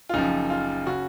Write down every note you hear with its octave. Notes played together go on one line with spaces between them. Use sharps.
F4
F#1 F#2 F3 D#4
F4
C#3 F#4